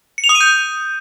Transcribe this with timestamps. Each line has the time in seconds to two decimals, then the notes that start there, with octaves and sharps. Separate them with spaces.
0.18 C#7
0.24 F7
0.29 D#6
0.35 D#7
0.41 G6